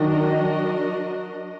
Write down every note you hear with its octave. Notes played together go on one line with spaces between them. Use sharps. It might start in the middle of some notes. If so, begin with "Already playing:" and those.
Already playing: D#3 F#3 D4 F#4 A#4 D#5